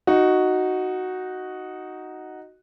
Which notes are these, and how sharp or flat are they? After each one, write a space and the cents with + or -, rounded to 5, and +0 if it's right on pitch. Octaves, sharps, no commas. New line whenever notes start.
D#4 +0 F#4 +0